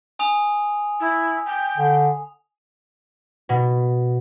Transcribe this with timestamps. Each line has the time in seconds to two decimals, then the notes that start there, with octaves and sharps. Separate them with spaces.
0.19 G#5 D#6 F7
1.00 E4
1.47 G5
1.78 D3
3.49 B2